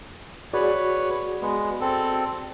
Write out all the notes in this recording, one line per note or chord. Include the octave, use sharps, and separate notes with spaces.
F#4 G#4 B4 C#5 D5
G#3 B3
C4 A4